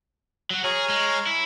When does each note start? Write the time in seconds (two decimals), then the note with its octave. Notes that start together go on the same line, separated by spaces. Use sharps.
0.51 F#3 F#4
0.64 G#4 C#5 A#5 F6
0.89 G#3
1.27 E4